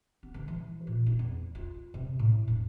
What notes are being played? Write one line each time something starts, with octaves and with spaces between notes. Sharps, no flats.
B3
D3
E3
A#2
D#4
E2
F4
C3
A2
E1